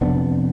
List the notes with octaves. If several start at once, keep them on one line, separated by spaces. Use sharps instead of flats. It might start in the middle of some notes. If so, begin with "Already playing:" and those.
F2 C3 B3 D4